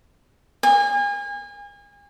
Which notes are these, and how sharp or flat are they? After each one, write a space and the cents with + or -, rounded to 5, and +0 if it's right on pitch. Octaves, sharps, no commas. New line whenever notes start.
G#5 -35